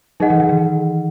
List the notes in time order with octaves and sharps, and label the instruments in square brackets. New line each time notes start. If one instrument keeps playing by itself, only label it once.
[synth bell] F#3 [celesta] D#4 G#4 D#5 F#5
[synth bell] E3
D#3
E3